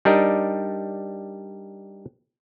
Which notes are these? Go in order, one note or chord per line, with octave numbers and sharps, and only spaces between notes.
G3 D4 D#4 G4 A#4 D#5